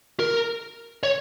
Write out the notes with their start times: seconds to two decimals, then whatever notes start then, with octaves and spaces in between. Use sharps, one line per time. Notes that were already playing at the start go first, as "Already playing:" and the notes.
0.20 A#4
1.03 C#5